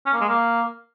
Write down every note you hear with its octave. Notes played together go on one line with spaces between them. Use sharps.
C#4
A#3
G#3
A#3